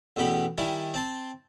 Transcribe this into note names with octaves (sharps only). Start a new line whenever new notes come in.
A1 E2 B2 G4 B5
D#3 G3 E4 G#5
C4 A5 C6